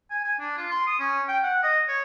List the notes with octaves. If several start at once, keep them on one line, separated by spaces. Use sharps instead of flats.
G#5
G#5
D4
F4
C6
D#6
C#4
G5
F#5
D#5
C#5